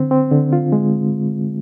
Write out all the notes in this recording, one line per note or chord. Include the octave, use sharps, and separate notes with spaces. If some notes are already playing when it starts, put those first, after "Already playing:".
Already playing: D3 C4
C4
D3
F4
G#3